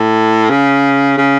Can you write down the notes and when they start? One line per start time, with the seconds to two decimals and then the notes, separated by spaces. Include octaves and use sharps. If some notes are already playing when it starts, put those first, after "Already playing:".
Already playing: A2
0.50 C#3
1.17 C#3